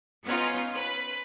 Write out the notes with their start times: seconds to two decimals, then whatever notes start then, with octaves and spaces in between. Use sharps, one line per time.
0.25 B3 C#4 D#4 F4
0.75 B4